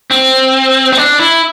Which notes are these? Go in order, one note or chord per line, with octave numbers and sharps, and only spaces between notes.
C4
C4
D4
E4